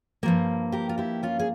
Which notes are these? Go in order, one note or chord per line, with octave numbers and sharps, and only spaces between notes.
G2 F3 A#3
G4 A#4
F4
E4 G4
C#4 F4
G#4